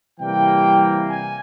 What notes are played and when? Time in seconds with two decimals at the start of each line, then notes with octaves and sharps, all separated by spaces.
0.20 C3 E3 G3 A#3 G5
1.07 G#5